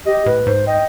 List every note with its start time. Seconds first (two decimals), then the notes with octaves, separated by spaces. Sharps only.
0.06 G4 D#5
0.26 A2 B4
0.47 G#2 C5
0.67 D#5 G5